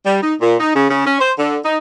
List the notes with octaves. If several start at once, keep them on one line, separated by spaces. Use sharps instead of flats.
G3
D#4
A#2
D#4
C#3
C#3
C#4
C5
D3
D#4